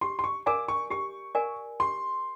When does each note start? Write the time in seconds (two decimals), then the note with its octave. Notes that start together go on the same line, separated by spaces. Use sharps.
0.01 G4 C6
0.19 C6
0.24 C#6
0.46 A#4 D5 F5 G#5 D6
0.68 C#6
0.90 G4 C#6
1.35 A#4 D5 F5 G#5
1.80 G4 C6